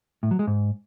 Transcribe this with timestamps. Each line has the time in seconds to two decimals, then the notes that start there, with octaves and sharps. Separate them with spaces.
0.23 A2
0.31 F#3
0.39 G#3
0.47 G#2